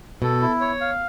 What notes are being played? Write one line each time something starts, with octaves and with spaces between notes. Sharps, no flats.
B2 A4
E4
C#5
F5